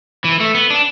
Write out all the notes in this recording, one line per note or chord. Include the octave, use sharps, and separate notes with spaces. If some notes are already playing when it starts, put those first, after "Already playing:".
E3
A3
B3
D4